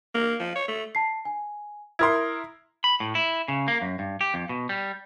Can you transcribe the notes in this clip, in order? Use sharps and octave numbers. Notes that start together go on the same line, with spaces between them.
A#3
F3
C#5
A3
A5 C7
G#5
E4 A#4 C6 D#6 G#6
B5
A2
E4
C#3
A#3
F#2
G2
G4
F2
B2
G3